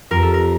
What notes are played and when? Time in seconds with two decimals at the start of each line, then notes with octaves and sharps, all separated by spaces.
0.11 F2 A#4
0.23 A4
0.34 A#4